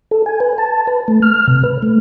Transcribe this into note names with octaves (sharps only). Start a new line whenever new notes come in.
A4
G#5
B4
A5
B4
A3
F6
C3
B4
A3